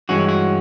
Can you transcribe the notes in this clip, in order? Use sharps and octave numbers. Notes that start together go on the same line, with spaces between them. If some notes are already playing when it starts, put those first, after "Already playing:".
G2 E3 G#3 C#4 F#4
F#4